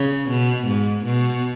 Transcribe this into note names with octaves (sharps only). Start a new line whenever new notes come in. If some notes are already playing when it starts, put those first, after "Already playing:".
Already playing: C#3
B2
G#2
B2